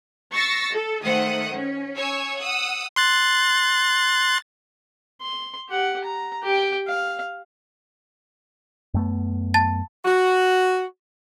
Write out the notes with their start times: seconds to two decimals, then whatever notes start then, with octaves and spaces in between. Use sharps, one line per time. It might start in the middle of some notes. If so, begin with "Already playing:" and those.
0.34 C#6 E6 A6 A#6 C7 C#7
0.73 A4
1.04 D#3 A3 C5 F#5 D#6
1.54 C#4
1.96 C#5 G#5 E6 G#6
2.39 F#5 D#6 E6
2.96 C6 F#6 A6
5.21 C6
5.69 G4 F#5
6.04 A#5
6.43 G4 G5
6.87 F5
8.94 F#2 A3 B3
9.54 A5 A6
10.05 F#4